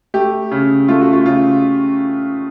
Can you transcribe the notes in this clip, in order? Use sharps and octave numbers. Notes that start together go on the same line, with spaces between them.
A3 G4
C#3
A3 F4
F#4
F4
C#3 F4